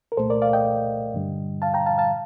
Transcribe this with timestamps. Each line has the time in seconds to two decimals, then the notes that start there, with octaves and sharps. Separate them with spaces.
0.12 A#4
0.17 C2 A#2 A3 A4 C5
0.30 A#4 D5
0.42 D5 F5
0.53 D#5 G5
1.14 G2 D3 G3
1.62 F5 A5
1.74 G5 A#5
1.86 F5 A5
1.98 F5 A5